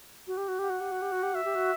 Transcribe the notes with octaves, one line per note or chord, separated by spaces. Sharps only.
F#4
G4
F#4
G4 F#5
F#4
G4
F#4
G4
F#4
G4
F#4 E5
G4
F#4